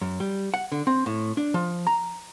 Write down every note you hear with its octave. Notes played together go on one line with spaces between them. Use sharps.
F#2
G3
F#5
D3
C4
A2
D4
F3
A#5